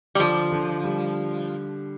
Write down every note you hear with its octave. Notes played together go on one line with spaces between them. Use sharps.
G3
D3 F3
D3
G3